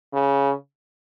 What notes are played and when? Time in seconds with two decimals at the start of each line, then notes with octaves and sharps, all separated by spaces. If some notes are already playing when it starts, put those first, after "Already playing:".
0.14 C#3